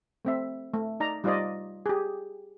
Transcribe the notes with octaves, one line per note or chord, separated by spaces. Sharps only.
A3 C4 E5
A3
D#4 D5 A#5
G3 D#4 F4 C5 D5 D#5
G4 G#4